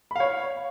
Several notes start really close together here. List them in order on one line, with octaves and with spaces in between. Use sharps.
B5 F5 C#5